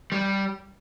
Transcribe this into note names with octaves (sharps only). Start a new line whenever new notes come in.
G3